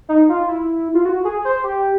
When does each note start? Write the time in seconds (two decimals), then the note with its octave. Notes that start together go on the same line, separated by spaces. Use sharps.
0.09 D#4
0.29 F4
0.48 E4
0.95 F4
1.05 F#4
1.25 G#4
1.45 C5
1.64 G4